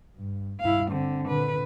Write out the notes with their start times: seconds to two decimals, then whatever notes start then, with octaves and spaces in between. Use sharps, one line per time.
0.16 G2
0.60 G2 E4 F5
0.91 D3 C4
1.28 A#2 D3 B4